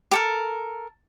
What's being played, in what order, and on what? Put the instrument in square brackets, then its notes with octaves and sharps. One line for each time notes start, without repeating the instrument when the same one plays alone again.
[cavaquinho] G4 A4 A#4